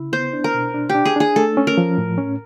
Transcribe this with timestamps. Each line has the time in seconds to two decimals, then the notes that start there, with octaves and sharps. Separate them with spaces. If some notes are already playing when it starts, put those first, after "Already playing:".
Already playing: C#3 E4
0.12 B3 C5
0.33 D4
0.44 A#4
0.54 B2
0.74 D4
0.89 G4
0.95 D4
1.05 G#4
1.16 D4 G#4
1.36 A3 A4
1.57 C#4
1.67 A#4
1.78 F3
1.98 A2
2.18 C#4